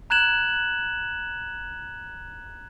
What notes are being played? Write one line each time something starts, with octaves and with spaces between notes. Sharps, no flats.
A#5 F#6 G#6 E7 F#7